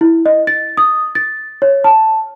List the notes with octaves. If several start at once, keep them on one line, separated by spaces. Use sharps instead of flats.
E4
D#5
A6
D#6
A6
C#5
A5